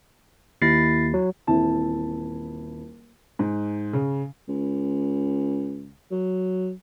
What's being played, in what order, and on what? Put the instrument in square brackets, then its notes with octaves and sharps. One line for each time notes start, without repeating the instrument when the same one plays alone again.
[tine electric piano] D#2 [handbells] E4 A6 C7
[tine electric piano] F#3
[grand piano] D#1 E3 C4 E4 A5
[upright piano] G#2
C#3
[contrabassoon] C#2
F#3